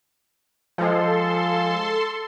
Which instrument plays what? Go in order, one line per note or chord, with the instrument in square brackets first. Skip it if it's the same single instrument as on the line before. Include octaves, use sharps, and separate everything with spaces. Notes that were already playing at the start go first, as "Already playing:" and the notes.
[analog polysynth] F3 G#3 [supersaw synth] A4 C6